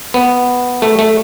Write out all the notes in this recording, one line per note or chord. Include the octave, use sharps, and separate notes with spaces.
B3
A3
A3